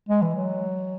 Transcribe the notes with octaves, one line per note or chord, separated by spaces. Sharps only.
G#3
E3
F#3